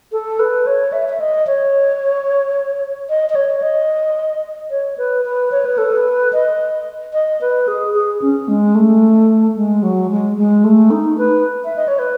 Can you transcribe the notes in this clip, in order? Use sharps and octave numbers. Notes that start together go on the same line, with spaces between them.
A4
B4
C#5
E5
E5
D#5
C#5
D#5
D#5
C#5
D#5
C#5
B4
B4
C#5
B4
A4
B4
D#5
D#5
B4
G#4
G#4
C#4
G#3
A3
G#3
F#3
G#3
G#3
A3
D#4
B4
E5
D#5
C#5
B4